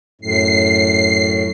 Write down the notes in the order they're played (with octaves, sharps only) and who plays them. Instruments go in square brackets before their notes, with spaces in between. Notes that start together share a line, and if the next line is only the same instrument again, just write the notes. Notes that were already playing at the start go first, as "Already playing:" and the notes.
[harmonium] F#2 A2 [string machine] C7